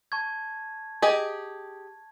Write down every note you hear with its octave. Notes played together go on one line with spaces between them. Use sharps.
A5 C#6 G#6
G4 G#4 D#5